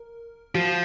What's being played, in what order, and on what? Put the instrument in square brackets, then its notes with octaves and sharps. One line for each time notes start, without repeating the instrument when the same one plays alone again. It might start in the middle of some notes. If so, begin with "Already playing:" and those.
Already playing: [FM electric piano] A#4
[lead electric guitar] F3 [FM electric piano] F#4